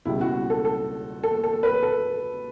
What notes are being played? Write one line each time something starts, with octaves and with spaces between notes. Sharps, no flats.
C#2 B2 G3 E4
F#4
A4
A4
A4
A4
B4
A4